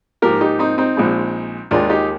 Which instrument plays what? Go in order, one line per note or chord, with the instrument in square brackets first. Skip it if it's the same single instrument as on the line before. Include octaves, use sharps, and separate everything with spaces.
[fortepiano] G#2 F3 A#3 G4 A#4
D#4 G4
C4 D#4
C4 D#4
A#1 A#2 G#3
D#2 D#3 G#3 D4 F4
D#4 G4